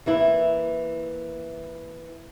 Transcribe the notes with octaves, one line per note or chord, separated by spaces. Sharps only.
E3 A#3 E4